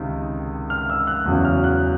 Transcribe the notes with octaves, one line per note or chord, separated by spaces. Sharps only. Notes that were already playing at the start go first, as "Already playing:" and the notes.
Already playing: C#2 C3 D#3
F6
E6
F#6
E2 C#3 F#3
F6
F#6